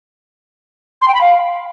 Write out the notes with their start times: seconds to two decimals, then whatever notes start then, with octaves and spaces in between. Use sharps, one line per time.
1.01 C6
1.08 G5
1.14 B5
1.21 F5